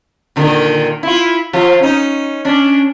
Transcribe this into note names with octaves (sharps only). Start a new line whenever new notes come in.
A#2 D3 D#3
E4 F4
F3 F4
C#4 D#4
C#4 D4